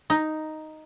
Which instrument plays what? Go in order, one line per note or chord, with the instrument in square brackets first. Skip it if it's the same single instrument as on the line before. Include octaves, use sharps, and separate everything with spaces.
[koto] D#4